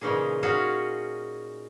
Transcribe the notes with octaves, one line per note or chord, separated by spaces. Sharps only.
A#2 C#3 E3 C#4 D#4 G#4
C#4 D#4 F#4 G#4 C#5 F5